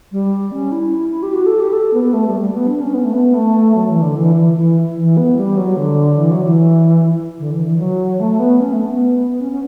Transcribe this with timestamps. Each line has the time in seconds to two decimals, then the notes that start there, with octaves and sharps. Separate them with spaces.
0.12 G3
0.52 C#4
0.72 E4
1.23 G4
1.33 F#4
1.46 A4
1.60 G4
1.73 A4
1.93 B3
2.04 B3
2.13 A3
2.27 G3
2.41 G3
2.53 B3
2.67 D4
2.81 C#4
2.94 B3
3.04 A3
3.13 B3
3.34 A3
3.75 F#3
3.89 E3
4.02 D3
4.16 E3
4.36 E3
4.56 E3
4.97 E3
5.17 B3
5.37 G3
5.57 F#3
5.77 D3
6.17 E3
6.31 F#3
6.44 E3
7.39 D3
7.51 E3
7.65 E3
7.79 F#3
8.20 A3
8.39 B3
8.60 C#4
8.73 A3
8.86 B3
9.40 C#4
9.52 C#4